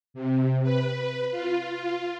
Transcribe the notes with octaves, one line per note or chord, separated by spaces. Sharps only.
C3
B4
F4